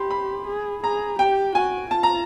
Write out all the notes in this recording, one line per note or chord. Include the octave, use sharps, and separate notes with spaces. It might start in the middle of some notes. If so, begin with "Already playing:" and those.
Already playing: G4 B5 C6
B5
G#4
G#4 A#5
G4 G5
F#4 G#5
F4 A5
A#5